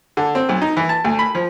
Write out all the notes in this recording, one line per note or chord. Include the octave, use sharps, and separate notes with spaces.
D3
C4
B1
D#4
E3
A5
D2
B5
F3